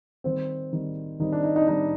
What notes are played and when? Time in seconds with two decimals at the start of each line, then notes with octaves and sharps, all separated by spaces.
0.24 D#3 G3 C4 C5
0.73 D#3 G3 C4
1.20 D#3 G3 C4 D#4
1.32 D4
1.43 D#4
1.56 D#4
1.61 D4
1.67 D#3 G3 C4 D#4